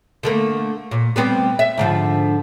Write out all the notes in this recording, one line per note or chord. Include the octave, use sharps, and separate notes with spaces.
D3 A3 A#3
A#2
G3 B3 C4
E5
G#2 D3 F3